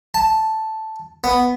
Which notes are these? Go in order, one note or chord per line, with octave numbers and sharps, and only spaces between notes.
A5
B3